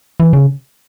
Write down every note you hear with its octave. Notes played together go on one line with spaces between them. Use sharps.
E3
C#3